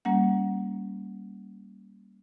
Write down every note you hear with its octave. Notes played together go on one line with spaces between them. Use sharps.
G3 A#3 C#4 F#5